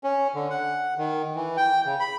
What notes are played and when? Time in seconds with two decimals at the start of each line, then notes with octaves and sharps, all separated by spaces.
0.04 C#4
0.35 D3
0.50 F#5
0.98 D#3
1.36 E3
1.57 G5
1.86 C#3
2.00 B5